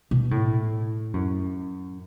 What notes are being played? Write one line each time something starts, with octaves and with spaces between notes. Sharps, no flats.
B2
A2
F#2